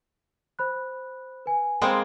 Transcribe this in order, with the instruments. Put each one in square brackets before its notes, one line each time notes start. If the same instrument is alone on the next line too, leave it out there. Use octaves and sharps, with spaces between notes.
[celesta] C5 B5 F#6
B4 G#5
[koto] G#3 A#3 C4 [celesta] B5 D#6 C#7